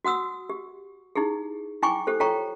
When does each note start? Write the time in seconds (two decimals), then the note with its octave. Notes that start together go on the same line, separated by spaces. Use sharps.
0.05 F#4 F#5 D#6 E6
0.49 G4
1.15 D#4 E4 G4 G#4
1.82 E4 G5 G#5 C#6 D6
2.07 G4 A4 C5
2.20 F4 A4 C#5 G5 A#5 C#6